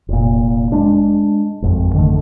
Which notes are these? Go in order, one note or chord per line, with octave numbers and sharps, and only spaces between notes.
F1 A#2
G#3 D4
G#1 F2
D3 D#3 A3